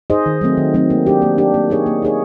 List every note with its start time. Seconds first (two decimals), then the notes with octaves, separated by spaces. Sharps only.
0.10 D#4 G#4 C5 D#5
0.26 D#3
0.41 F#3 A3 C4
0.57 D#3
0.74 F#3 A3 C4
0.90 A#3
1.06 D4 G4
1.22 A#3
1.38 D4 G4
1.54 A#3
1.70 D#4 G#4 C#5
1.86 A#3
2.02 D#4 G#4 C#5